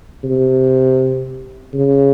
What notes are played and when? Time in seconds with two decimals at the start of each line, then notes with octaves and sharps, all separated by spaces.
0.24 C3
1.73 C#3